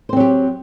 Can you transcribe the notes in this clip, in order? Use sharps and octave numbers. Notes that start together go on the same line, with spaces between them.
F#3 C4 G4 C5